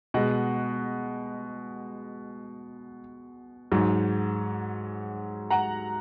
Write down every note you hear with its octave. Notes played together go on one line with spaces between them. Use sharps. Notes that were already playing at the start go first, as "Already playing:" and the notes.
B2 G#3 D#5 F#5
G#2 F#3
F#5 A#5